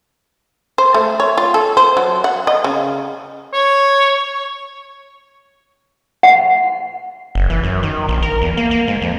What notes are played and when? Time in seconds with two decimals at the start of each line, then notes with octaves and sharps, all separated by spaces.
0.78 C5
0.94 A3
1.20 C#5
1.38 F4
1.54 A4
1.77 C5
1.97 F#3
2.24 F#5
2.47 D#5
2.64 C#3
3.53 C#5
6.23 F#5
7.35 F#1
7.50 E3
7.64 F#2
7.83 D#3
8.09 A#1
8.22 A#4
8.42 E2
8.57 A#3
8.71 A#3
8.87 G#2
9.02 F2